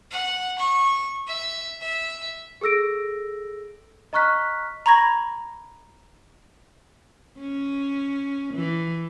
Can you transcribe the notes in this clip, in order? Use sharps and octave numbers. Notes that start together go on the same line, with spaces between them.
F#5
C#6
E5
E5
G#4 A4 E6 A#6 D7
D#5 A#5 C#6 F6 F#6 B6
A#5 B5 C#6 G#6 A#6
C#4
E3